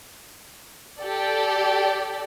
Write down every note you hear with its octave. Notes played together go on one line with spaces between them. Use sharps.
G4 A4 D5